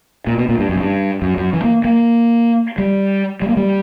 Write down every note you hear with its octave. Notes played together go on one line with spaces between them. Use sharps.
A#2
B2
A#2
G2
F#2
A#2
G2
F#2
F#2
E3
A#3
A#3
G3
G3
A#3
G3